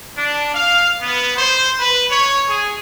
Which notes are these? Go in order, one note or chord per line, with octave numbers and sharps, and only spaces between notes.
D4
F5
B3
C5
B4
C#5
G#4